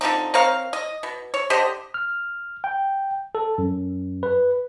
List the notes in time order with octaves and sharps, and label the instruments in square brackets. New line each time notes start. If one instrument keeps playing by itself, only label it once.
[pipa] D3 F3 C4 D#4
C4 A#4 C#5 F5
D#5
B2
C#5
D3 G4 C5 D#5
[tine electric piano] F6
G5
A4
F#2
B4